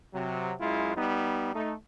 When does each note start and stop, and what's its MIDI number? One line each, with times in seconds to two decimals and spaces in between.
0.12 0.54 48
0.12 0.54 54
0.60 0.94 42
0.60 0.94 56
0.60 0.94 64
0.60 0.94 65
0.97 1.52 55
0.97 1.52 59
0.97 1.52 63
1.53 1.73 57
1.53 1.73 63